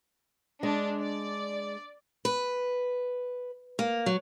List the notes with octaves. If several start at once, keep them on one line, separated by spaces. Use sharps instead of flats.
G#3 D4
D5
B4
A#3
F#3